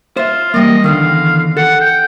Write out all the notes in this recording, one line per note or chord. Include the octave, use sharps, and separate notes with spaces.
F4 C5 E5
E2 G3 A#3 D#5
E2 D3 D#3 F5
A4 F#5
G5